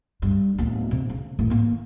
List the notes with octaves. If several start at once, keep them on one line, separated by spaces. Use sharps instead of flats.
G2
D1 B3
C3
C#3
A2 D#3
A#3 B3